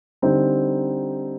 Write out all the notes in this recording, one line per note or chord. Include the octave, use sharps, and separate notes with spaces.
D3 G3 C4 D#4